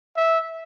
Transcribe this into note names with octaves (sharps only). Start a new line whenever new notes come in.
E5